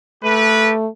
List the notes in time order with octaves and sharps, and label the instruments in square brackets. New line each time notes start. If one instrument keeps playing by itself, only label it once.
[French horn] A3 [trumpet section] G4 A4 B4